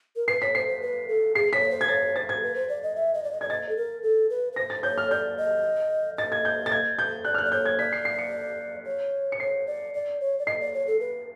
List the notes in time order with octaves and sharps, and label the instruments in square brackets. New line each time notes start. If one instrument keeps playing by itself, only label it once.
[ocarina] A#4
[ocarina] B4 [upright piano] C7
[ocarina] C#5 [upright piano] B6
[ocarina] C5 [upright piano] C7
[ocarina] C5
B4
A4
[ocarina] G#4 [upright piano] C7
[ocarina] C#5 [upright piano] B6
[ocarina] C5
[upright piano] G#6
[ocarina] C#5 [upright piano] A6
[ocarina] C5 [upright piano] A6
[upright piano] G#6
[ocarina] B4
C5
D5
D#5
E5
D#5
D5
D#5
[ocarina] D5 [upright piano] G#6
[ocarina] D#5 [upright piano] A6
[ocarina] A4
A#4
A4
B4
B4
[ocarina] C5 [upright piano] A#6
[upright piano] A6
[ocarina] C#5 [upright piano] G6
[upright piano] F6
[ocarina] D5 [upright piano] G6
[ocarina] D#5
[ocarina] D#5 [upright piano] A6
[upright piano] G#6
G6
A6
G#6
G6
[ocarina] D5 [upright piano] F#6
[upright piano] F6
F#6
[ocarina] D5
[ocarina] C#5 [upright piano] G6
[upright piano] G#6
[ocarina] D5 [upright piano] B6
[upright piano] C7
C7
C#7
[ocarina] C#5
[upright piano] C#7
[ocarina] C#5 [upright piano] C7
[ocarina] D5
D5
C#5
D5
[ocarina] D#5 [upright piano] C7
[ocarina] D5
C#5
A4
B4